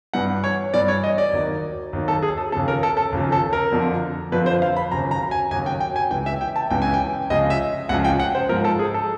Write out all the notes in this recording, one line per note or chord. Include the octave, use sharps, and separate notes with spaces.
G2 E3 F#5
C#5
G2 E3 D5
C#5
D#5
D5
D#2 D#3 F#3
D#2 D#3 F#3
A4
G#4
A4
D#2 C#3 F3 A4
A#4
A4
A4
D#2 C#3 F3
A4
A#4
F2 D3 F3
F2 D3 F3 B4
C5
F5
B5
D#2 C#3 F#3 A#5
A#5
G#5
D#2 C#3 F#3 G#5
G5
G5
G#5
C#2 C#3 E3 G5
E5
G5
A5
C#2 C#3 E3 G5
G#5
G5
C#2 C#3 F3 D#5
E5
C#2 C#3 F3 F#5
G5
F#5
C5
G#2 F3 A#4
A4
G#4
A4